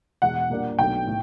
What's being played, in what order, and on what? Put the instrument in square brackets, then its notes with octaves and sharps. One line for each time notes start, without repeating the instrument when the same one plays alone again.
[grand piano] E2 B2 G#3 [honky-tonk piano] F#5
[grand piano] A#2 G3 A#3 D4
[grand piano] B1 B2 F#3 A3 D4 [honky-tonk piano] G5
[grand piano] A2